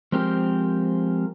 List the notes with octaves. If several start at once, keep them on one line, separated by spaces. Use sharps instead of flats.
F3 G#3 C4 G4 A#4